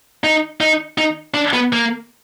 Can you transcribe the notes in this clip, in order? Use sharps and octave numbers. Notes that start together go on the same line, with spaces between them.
D#4
D#4
D#4
D4
B3
A#3